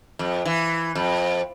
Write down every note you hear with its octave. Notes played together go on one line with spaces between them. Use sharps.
F2
E3
F2